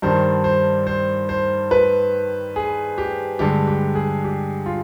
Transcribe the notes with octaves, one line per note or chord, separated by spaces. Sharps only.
G2 D#3 G3 D4 C5
C5
C5
C5
B4
G#4
G4
G2 D3 G#3 G4
G4
G#4
G4
F4